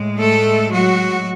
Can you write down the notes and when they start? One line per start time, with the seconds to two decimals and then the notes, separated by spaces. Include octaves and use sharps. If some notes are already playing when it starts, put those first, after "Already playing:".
Already playing: A2 G#3
0.19 A3 A4
0.71 F#3 F#4